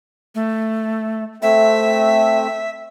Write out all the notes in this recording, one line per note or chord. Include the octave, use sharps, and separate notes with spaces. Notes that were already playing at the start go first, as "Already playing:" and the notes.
A3
A3 C4 E5